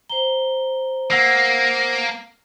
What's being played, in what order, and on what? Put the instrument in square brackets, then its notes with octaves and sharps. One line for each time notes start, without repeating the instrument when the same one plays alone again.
[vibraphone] C5 A#5 [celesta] G7
[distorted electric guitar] A#3 [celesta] F#5 E6 C7